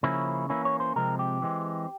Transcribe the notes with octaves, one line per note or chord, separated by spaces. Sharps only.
C#3 F3 A#3 C#4 E4
E3 A#3 C#4 E4
C#5
C5
C3 F3 G#3 C4 A#4
G4
E3 G#3 C4